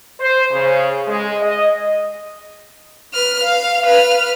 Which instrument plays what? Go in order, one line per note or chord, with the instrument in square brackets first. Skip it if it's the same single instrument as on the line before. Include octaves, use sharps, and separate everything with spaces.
[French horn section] C5
C#3
G#3
D#5
[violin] B4 F6
F5
B4 F6